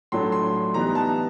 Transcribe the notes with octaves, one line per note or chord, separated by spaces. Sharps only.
A2 F#3 A3 D4 C6
C6
E3 G3 B3 D#4 A#5
A5